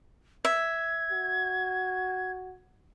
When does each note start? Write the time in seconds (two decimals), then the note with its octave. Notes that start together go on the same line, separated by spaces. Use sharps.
0.45 E5 G#6
1.11 F#4